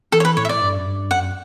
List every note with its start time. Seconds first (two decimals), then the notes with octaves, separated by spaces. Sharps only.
0.12 E3 A4
0.20 C#5
0.25 B4
0.37 A2 C#5
0.45 E5
0.49 D5
0.61 G2
0.76 F#2
0.86 G2
1.11 F#2 F#5